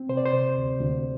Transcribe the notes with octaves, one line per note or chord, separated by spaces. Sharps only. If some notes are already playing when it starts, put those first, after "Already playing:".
Already playing: C4
C3 C5
D5
C5
C3
D2
D2